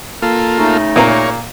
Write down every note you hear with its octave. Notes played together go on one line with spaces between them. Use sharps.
A#3 F4 A4
C#3 A3 D#4
A#2 A#3 A#4 C#5 A#5